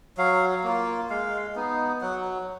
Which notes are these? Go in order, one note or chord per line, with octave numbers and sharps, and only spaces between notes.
F#3 F5
A#3 F4
G#3 F5
B3 D#4
F#3 F#5